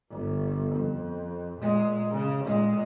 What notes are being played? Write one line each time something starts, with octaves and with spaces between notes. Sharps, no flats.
G1
F2
A#2 G#3
C#3
A#2 G#3